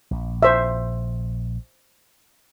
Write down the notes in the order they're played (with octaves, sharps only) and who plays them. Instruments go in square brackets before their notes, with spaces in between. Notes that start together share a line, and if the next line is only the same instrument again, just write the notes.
[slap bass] A#1
[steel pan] C5 E5